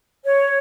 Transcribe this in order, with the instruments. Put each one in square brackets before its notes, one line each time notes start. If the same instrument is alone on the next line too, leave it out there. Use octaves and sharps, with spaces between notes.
[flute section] C#5